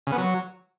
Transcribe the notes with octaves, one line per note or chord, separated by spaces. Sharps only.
C#3
B3
F#3